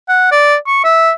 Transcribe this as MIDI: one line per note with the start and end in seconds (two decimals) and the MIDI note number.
0.09 0.29 78
0.32 0.55 74
0.67 0.83 85
0.84 1.12 76